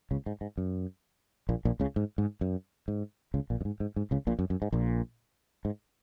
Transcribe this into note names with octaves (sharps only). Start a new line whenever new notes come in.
C#2 C#3
G#2
G#2
F#2
A#1 A#2
A#1 A#2
C#2 C#3
G#2
G#2
F#2
G#2
C#2 C#3
A#1 A#2
F#2
G#2
G#2
G#2
C#2 C#3
A#1 A#2
F#2
F#2
G#2
A#1 A#2
G#2